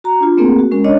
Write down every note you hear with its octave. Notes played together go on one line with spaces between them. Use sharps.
F#4 A#5
D4 F4
A3 A#3 C4 G#4 A#4
F#4
G#3 C#4 A#4
D4 C#5 D#5